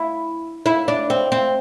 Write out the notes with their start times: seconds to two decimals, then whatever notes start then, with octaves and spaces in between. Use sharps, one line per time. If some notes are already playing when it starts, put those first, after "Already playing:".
Already playing: E4
0.66 E4
0.88 D4
1.10 C4
1.32 C4